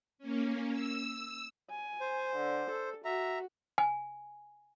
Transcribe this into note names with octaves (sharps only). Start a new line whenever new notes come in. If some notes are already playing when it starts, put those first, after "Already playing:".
A#3 C#4
E6
G#5
C5
D3
A4
F#4 E5 A#5
G#5